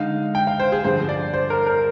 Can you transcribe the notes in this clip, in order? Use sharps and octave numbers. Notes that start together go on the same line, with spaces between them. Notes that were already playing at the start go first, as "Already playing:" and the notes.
Already playing: D3 G#3 D#4 F5
G5
F5
C5
G#4
G2 D3 F3 C5
D5
C5
A#4
A#4